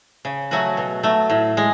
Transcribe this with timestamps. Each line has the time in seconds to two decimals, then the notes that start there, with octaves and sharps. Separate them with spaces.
0.25 C#3
0.51 F#3 A3 C#4 F#4
0.77 B2
1.03 F#3 A3
1.30 A2
1.57 G#3